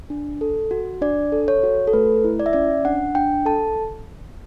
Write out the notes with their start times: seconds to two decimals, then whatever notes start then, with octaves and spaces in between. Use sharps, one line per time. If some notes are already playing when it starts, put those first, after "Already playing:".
0.10 D4
0.41 A4
0.71 F#4
1.01 D4 D5
1.32 A4
1.48 C#5
1.63 F#4
1.87 A4
1.93 A3 B4
2.24 E4
2.40 D5
2.46 E5
2.53 C#4 D5
2.85 D4 F#5
3.15 D4 G5
3.45 A4 A5